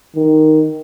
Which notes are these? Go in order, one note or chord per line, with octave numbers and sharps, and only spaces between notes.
D#3